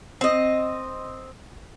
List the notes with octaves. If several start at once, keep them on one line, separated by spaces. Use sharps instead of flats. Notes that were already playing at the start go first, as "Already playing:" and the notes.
C4 D#5